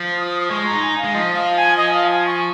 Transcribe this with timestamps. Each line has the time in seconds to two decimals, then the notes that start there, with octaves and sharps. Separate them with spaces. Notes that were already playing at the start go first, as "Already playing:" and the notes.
Already playing: F3
0.18 D#6
0.49 G#3 C#6
0.66 A#5
0.71 D#4
0.82 G#5
0.98 F5
1.04 G#3
1.14 F3 D#5
1.34 F5
1.57 G#5
1.77 D#5
1.94 F5
2.10 G#5
2.26 C#6